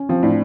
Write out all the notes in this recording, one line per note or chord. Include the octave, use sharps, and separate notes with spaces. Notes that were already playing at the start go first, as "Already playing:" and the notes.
Already playing: C#4
F3 C4
A2 D4